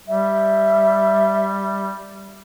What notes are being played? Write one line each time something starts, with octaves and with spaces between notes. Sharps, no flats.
G3 E5